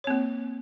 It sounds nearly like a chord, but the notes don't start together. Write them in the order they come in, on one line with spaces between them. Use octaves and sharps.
C#5 C4 A#3